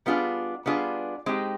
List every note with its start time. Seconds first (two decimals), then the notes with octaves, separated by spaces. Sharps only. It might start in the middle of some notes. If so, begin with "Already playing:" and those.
0.06 G3 B3 D4 F4 G#4
0.66 G3 B3 D4 F4 G#4
1.26 G#3 C4 D#4 G4